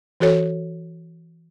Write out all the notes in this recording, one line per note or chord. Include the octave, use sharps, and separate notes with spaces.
E3 F#4 A4 C#5